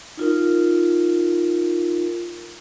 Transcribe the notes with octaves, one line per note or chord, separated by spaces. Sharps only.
D#4 F4 A#4